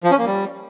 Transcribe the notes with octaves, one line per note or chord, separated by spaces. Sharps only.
F3
C#4
A#3
G3